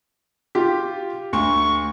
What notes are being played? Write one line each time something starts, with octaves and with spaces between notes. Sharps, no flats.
F4 G4
D2 C#6